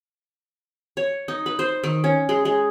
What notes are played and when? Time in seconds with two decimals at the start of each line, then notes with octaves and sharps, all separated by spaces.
0.97 C#5
1.28 D#4
1.46 B4
1.59 C5
1.84 D#3
2.04 C#4
2.29 G#3
2.45 G#3